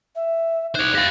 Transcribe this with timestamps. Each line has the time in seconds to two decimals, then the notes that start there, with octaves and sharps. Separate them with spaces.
0.15 E5
0.75 D#4 C5 D5 F#6 G#6
0.95 G4 F5 A6 A#6